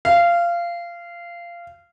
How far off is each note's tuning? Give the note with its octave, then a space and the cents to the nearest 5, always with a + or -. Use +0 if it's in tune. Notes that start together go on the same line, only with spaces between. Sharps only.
F5 -20